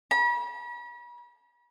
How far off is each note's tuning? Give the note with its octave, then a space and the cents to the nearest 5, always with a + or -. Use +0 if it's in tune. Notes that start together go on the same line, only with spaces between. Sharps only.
B5 -40